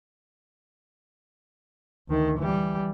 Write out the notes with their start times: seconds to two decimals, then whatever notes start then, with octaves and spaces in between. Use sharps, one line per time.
2.08 D2 D#3
2.39 E3 G3